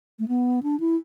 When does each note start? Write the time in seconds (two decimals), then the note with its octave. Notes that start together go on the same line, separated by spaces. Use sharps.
0.19 A3
0.28 B3
0.63 D4
0.80 E4